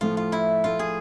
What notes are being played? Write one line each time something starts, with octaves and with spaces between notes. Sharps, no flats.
A2 F3 A3 F4
F4
E4
A2 F3 A3 F4
G#4